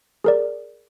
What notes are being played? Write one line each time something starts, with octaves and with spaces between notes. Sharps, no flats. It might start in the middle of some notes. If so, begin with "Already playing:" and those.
G#4 A#4 D5